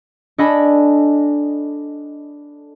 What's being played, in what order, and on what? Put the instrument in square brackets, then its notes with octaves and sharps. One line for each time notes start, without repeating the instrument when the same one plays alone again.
[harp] D4 A4 D#5 G#5 B5